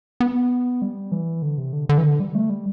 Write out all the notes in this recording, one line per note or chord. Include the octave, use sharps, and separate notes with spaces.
B3
G3
E3
D3
C3
D3
D3
E3
D3
G3
A3
G3